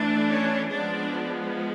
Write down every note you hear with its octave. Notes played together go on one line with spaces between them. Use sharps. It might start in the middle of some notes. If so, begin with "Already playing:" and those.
Already playing: E3 A3 D4
C#4 C#5
F3 G#3 B3 D4 D5